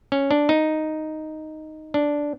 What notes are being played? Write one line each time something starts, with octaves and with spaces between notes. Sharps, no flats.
C#4
D4
D#4
D4